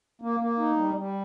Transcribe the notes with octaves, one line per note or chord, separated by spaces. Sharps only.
A#3
A#3
D#4
G3
G3